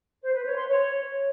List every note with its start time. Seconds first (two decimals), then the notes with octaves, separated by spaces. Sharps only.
0.23 C5
0.34 B4
0.45 C#5
0.57 C6
0.68 C#5